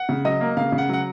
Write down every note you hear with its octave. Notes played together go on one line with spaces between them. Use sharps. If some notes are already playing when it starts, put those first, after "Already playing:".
Already playing: F#5
C#3
F#3 D#5
A#3
C#3 F5
C#3
F#5
F#3 F#5